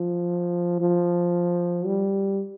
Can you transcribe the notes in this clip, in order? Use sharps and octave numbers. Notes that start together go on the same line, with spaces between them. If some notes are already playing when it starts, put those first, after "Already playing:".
Already playing: F3
F3
G3